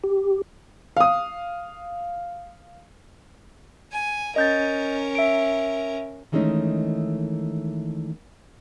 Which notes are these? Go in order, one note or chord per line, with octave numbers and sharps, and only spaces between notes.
G4
F5 D#6
G#5
C#4 A#4 D#5 G6 A6
E5 D7
D#3 E3 G#3 A3 C#4 D#4